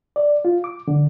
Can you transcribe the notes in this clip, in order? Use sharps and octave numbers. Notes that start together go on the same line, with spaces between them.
D5
F4
D6
D3